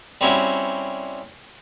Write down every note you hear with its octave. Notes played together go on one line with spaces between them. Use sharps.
G3 C4 C#4 E4 F#4